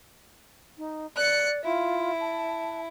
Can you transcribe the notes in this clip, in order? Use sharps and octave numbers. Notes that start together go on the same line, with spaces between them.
D#4
D5 F#6 C#7
E4 F4
A5